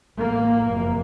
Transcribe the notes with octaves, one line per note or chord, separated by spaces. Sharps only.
A1 A2 A#3
F#1 F2 C3